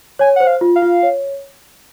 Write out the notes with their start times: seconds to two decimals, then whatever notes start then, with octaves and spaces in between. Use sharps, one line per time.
0.19 C#5 G#5
0.36 C5 F#5
0.47 F5
0.61 F4
0.76 F5
0.82 F4
1.03 C#5